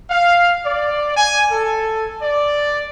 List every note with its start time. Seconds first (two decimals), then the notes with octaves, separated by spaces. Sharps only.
0.10 F5
0.65 D5
1.16 G#5
1.51 A4
2.21 D5